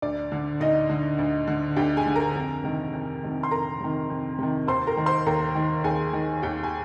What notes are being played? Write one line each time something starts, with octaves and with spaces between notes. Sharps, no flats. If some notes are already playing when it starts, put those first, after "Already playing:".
D2 D5
D3
D2 D#4 D#5
D3
D2
D3
D2 G4 G5
G#4 G#5
D3
A#4 A#5
F2
C3 D#3
F2
C3 D#3
C6
F2 A#4 A#5
C3 D#3
F2
C3 D#3
D#2 C5 C6
A#4 A#5
D#3
C5 C6
D#2 A#4 A#5
D#3
D#2 G#4 G#5
D#3
D#2 G4 G5
G#5